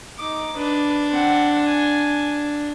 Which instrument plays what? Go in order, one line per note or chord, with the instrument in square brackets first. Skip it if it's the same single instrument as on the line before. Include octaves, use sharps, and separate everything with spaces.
[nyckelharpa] D#4 D6
[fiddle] D4 [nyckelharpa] B4
[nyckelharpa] C4 F#5
G#5